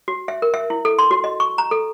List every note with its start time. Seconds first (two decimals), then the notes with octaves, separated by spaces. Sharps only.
0.08 F#4
0.28 E5
0.42 A#4
0.54 E5
0.70 E4
0.85 A4
0.99 C6
1.11 F#4
1.24 D#5
1.40 C#6
1.58 A#5
1.71 A4